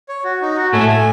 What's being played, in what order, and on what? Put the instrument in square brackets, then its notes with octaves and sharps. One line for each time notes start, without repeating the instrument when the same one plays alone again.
[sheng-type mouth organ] C#5
F#4
D#4
F#4
[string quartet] A2 A3 [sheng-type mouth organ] G#5
[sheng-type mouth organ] G#5